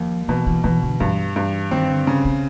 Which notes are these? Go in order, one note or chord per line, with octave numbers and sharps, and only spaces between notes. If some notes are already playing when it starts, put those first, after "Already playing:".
Already playing: D#2 F3
B2 E3
E3
B2 E3
D3
G2 E3
G2
D#3 C4
D3
C#3
C3